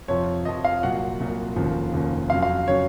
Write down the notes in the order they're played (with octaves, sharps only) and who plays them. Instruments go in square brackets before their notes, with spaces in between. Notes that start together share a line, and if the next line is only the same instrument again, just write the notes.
[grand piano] F2 C3 F3 C#5
F2 C3 F3 D#5
F5
C2 A#2 F#3 F#5
C2 A#2 F#3
F1 D#2 C#3 F3
F1 D#2 C#3 F3
F2 C#3 F#3 F5
F5
C#3 F#3 C#5